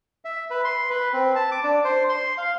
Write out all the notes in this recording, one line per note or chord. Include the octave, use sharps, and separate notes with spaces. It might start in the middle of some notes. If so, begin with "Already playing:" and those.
E5
B4
C6
B4
C4
A5
D6
D4
C5
C6
F5